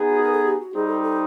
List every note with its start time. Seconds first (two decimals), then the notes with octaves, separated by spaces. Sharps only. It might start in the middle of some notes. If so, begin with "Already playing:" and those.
Already playing: B3 D#4 G#4
0.10 F#4
0.21 A#4
0.32 A4
0.45 G4
0.60 F#4
0.74 G3 C4 D#4 G#4
0.88 A4
1.02 A4